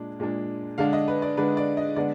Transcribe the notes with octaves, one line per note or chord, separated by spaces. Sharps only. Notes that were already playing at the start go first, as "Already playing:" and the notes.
Already playing: A#2 G#3 D4
A#2 G#3 D4
D3 G#3 D4 F5
D#5
B4
D5
D3 G#3 D4 B4
D5
D#5
D3 G#3 B3 D4 D5